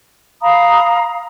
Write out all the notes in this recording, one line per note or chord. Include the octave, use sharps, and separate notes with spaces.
F5 A#5 B5 D#6